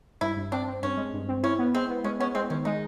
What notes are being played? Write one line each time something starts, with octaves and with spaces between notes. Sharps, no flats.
G2 E4
G2
C4 D4
C4
G2 C#4
G#3
G2
C4
C#4 E4
B3
G#3 C4
B3
G#3 C#4
B3 C#4
G#3 C4
D#3 C#4
G#3 D#4